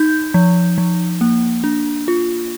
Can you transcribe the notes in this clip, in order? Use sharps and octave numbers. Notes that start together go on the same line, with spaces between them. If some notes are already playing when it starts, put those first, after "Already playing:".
Already playing: D#4 G6
F3
F3
A#3
D4
F4